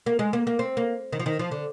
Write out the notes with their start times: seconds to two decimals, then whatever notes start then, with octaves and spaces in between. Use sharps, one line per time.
0.06 A#3
0.19 G#3
0.33 A#3
0.47 A#3
0.59 C4
0.77 A#3
1.12 D#3
1.20 F3
1.26 D#3
1.39 F3
1.51 D3